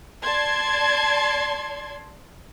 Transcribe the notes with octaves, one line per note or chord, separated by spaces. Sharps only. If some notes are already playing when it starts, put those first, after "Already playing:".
D5 A5 C6 G#6